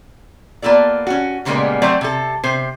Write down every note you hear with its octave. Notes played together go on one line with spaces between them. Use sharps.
A#3 B3 F4 A4 D5
C#4 F#4
A#2 C#3 G3 G#3 A#3 B3
F#3 A3 C4 D5
C3 A4
C3 C5